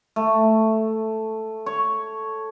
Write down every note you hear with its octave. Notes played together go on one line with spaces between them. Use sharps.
A3
C#5